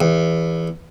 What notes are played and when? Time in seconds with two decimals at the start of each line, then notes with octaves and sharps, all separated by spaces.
0.01 E2